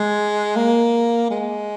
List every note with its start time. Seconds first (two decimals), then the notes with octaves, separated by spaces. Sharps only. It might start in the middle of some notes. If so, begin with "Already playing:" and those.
Already playing: G#3
0.56 A#3
1.31 G#3